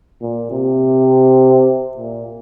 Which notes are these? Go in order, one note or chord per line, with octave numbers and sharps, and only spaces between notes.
A#2
C3
A#2